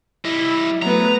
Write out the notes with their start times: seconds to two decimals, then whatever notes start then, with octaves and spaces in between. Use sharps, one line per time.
0.25 G3 E4 D#5
0.82 F#3 A3 B3 B4 A#5